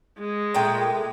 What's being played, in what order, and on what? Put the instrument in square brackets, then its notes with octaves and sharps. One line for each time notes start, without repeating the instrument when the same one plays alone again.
[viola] G#3
[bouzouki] A#2 A3 G5